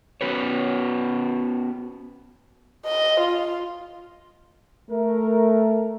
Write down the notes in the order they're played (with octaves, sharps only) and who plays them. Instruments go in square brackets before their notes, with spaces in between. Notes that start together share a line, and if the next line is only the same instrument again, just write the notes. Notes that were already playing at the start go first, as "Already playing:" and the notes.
[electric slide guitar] B3 C#4 F#4 B4 C#5
[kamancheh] D#5
F4
[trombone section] A3 A#4